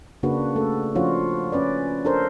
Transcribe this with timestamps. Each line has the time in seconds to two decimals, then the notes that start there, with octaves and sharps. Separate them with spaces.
0.23 C#3 A#3 D4 F#4 B4
0.56 A3 A4
0.95 F3 C#4 D4 F4 F#4 C#5
1.52 C#4 B4 D5
2.05 D4 A4 A#4 C5